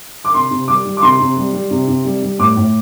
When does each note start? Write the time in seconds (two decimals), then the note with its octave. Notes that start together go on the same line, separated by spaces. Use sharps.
0.25 D6
0.34 C3 C6
0.51 C3
0.68 G3 D6
0.85 G3
0.97 D6
1.02 C3 C6
1.20 C3
1.37 G3
1.53 G3
1.71 C3
1.88 C3
2.05 G3
2.22 G3
2.39 A2 D6
2.56 A2